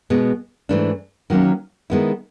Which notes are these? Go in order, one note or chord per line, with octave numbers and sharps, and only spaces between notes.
B2 G#3 B3
G#2 E3 A3 D4
D#3 F#3 A#3 C#4
D#3 G#3 B3 E4